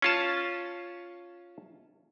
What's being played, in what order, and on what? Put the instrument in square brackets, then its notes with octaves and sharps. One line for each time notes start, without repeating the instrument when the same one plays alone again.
[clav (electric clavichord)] C#4 F4 A5